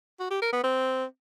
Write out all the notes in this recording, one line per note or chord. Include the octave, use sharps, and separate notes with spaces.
F#4
G4
A#4
B3
C4